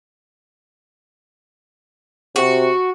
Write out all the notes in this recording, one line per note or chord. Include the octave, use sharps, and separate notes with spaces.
C3 F#4